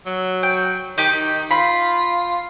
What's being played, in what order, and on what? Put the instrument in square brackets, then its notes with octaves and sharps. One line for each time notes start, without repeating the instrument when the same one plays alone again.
[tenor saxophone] F#3
[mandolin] G5
[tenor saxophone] D#3 [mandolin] D#4 G4
[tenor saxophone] F4 [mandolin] B5